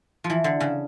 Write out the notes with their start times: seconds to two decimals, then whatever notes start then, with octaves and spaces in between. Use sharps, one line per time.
0.24 F3
0.30 E3
0.44 D3
0.60 C#3